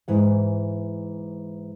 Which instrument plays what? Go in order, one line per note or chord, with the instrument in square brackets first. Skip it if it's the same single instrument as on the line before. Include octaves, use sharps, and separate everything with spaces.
[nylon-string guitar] G#2 E3 F#5